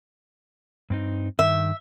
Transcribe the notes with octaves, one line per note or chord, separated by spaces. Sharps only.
G2 C4 D#4
G2 D#3 E5